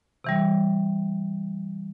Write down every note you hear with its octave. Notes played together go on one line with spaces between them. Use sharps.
C3 E3 G3